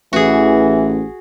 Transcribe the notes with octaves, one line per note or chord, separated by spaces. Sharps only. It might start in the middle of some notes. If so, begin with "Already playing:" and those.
A1 E3 F#4 G#4